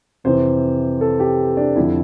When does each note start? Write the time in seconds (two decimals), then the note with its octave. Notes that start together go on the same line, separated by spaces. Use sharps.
0.24 F2 C3 E3 C5
1.01 A4
1.20 G4
1.57 D4
1.76 F2 D3 F3 E4